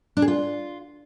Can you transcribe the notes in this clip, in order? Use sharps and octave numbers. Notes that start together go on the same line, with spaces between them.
D4
G#4
F4